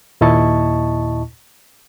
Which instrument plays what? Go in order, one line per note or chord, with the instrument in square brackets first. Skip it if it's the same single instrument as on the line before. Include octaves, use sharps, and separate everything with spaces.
[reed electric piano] D#2 A#2 E4 D#5 A5 C#6